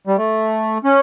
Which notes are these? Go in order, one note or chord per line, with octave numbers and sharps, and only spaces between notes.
G3
A3
C#4